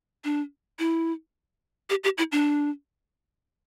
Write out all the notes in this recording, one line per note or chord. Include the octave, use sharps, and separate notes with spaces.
D4
E4
G4
G4
E4
D4